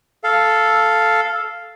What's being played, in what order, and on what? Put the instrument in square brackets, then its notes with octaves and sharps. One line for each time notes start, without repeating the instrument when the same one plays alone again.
[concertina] A4 F5